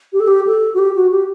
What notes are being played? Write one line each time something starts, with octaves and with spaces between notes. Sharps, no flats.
G4
A4
G4
A4
F#4
G4
F#4
G4